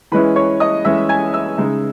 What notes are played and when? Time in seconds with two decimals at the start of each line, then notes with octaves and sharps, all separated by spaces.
0.12 E3 G#3 C#4 E4 B4 B5
0.36 C#5 C#6
0.60 D#5 D#6
0.85 E3 G#3 C#4 E4 E5 E6
1.09 G#5 G#6
1.34 E5 E6
1.58 C#3 G#3 D#4